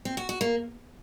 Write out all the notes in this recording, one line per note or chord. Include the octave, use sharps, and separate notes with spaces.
C4
F#4
F#4
A#3